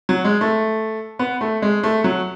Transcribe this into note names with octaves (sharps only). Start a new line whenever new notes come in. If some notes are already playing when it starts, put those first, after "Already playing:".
F#3
G#3
A3
B3
A3
G#3
A3
F#3